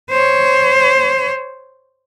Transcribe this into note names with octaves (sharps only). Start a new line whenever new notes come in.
C5 C#5